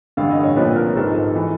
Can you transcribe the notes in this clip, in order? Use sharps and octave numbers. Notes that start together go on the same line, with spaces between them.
A1 G2 D3 F5
D#5
C#5
C2 A#2 F3 B4
A#4
G#1 G#2 F3 A4
E3